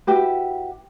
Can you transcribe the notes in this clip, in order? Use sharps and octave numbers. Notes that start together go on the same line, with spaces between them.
E4 F#4 G4 B4